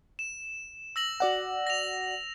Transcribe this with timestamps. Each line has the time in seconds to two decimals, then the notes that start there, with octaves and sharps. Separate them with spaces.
0.19 E7
0.96 E6 A#6 F#7
1.20 F#4 D5 F#5
1.67 A#6 F7